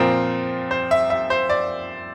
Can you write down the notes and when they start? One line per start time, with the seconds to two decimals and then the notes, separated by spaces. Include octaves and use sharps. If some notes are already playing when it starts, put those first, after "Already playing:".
Already playing: A#2 F3 C4 A#4
0.71 C5
0.91 E5
1.10 E5
1.30 C5
1.49 D5